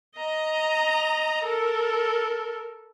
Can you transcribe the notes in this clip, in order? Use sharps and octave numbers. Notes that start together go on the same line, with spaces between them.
D#5 A#5
A4 A#4